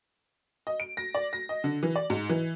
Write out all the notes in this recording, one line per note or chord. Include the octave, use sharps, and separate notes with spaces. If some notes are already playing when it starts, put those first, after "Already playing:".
D#5
D7
A#6
D5
A#6
D#5
D3
E3
D5
G#2
E3